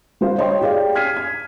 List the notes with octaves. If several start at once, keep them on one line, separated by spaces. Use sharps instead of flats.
G3 F#4 C5 F5
C#5 D#5 G5 C6
G4 G#4 D5 F5 G5
F6 G#6 B6 C7 D#7
G#6